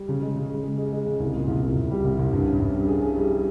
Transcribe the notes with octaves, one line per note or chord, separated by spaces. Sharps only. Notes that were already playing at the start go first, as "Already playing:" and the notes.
Already playing: G3
C#3
G#3
C#3
G#3
G#3
G#3
G#3
C#3
C2
A#2
C2
C2
C2
G3
C2
C2
G2
C#4
G2
G3
G#4
G#4
G3
G3